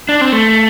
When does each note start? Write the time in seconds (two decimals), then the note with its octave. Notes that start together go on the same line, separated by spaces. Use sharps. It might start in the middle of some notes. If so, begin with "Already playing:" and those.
0.09 D4
0.21 C4
0.32 A3